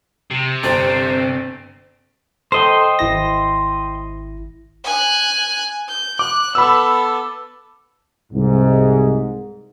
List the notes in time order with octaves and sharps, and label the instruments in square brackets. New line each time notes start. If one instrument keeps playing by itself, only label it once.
[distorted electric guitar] C3
[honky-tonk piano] G1 A6 [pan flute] C5
[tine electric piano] A4 [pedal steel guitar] C5 D#5 G5
[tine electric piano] G#1 E4 A#6
[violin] G#5 F#6
G6
[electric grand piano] D6 [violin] F#6
[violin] B3 A4 [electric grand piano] B5 E6
[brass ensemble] C2 G#2